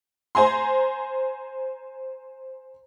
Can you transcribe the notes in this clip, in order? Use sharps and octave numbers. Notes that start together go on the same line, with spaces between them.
C5 G#5 A#5 C6